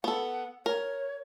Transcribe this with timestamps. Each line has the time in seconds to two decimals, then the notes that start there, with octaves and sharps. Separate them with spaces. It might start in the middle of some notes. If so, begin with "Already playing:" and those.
0.04 B3 A4 F#5
0.66 A#4 C#5